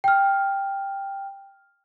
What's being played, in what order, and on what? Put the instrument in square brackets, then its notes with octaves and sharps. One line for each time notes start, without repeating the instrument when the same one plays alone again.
[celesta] G5 F6